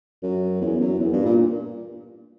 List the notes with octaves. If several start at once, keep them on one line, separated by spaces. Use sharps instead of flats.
F#2
E2
F#2
E2
G2
A#2